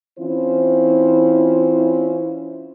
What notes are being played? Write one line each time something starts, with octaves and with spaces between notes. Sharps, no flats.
E3 C4 C#4 E4 F4 C5